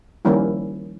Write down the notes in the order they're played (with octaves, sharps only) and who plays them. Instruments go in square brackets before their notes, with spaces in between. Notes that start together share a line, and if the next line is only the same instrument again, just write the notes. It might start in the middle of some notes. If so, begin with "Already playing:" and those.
[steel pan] D#3 F3 G3 A#3 C#4 E4